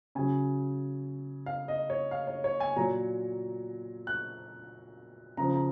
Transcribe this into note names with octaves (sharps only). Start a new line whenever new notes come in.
C#3 F#3 G#5
F5
D#5
C#5
F5
C#5
C#5
G#5
A#2 F#3 A#5
F#6
C#3 F3 A#5
A#5